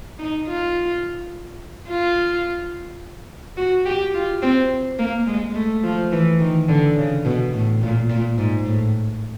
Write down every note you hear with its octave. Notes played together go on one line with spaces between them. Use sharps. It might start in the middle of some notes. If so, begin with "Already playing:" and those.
D#4
F4
F4
F#4
G4
F4
C4
A#3
G#3
A3
F3
E3
D#3
D3
C#3
B2
A2
A#2
A#2
G#2
A2